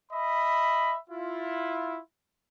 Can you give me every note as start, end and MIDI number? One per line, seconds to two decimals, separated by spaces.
0.12 0.97 75
0.12 0.97 76
0.12 0.97 83
1.10 1.99 64
1.10 1.99 65